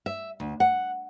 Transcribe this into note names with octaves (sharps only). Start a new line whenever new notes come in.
E5
D2
F#5